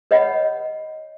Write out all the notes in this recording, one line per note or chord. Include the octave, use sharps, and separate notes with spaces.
B4 C#5 D#5 F#5 B5